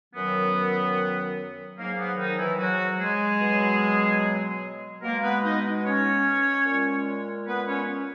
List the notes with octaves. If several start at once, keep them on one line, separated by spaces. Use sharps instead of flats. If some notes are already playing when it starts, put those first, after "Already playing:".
F#2 D#3 F#3 B3
G#2 F#3 A#3
B3
D#3 D#4
E3 E4
F#3 F#4
G#3 G#4
B2 F#3
B2 G#3 A#3 A#4
B3 B4
D#4 D#5
C#4 C#5
A#2
G#3
B3 B4
C#4 C#5